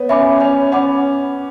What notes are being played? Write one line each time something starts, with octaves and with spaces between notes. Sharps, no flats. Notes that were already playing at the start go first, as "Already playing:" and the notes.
Already playing: B3 C#5
C#4 E5 G#5 B5 D6
C#4 C#5
C#4 F#5 B5 D6